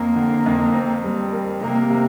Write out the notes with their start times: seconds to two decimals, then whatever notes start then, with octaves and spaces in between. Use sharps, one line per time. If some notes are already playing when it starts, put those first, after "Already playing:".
Already playing: F2 A#3
0.16 D3
0.46 F2
0.74 C4
1.04 G3
1.32 A#4
1.61 C3 A#3
1.90 C3